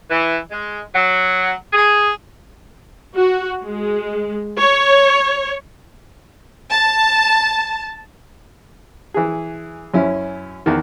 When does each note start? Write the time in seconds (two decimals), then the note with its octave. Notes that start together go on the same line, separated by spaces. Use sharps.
0.10 E3
0.51 G#3
0.94 F#3
1.73 G#4
3.16 F#4
3.65 G#3
4.58 C#5
6.70 A5
9.14 E3 G#4
9.94 F#2 C#4 E4
10.66 E2 D#3